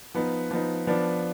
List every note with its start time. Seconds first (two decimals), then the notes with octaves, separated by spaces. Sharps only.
0.14 F3 B3 D#4
0.51 F3 B3 D#4
0.87 F3 B3 D4